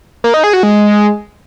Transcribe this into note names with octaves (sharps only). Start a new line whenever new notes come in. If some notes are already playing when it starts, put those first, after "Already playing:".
A#3
D#4
G#4
F#4
G#3